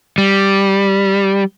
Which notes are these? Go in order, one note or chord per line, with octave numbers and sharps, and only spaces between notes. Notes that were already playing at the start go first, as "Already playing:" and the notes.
G3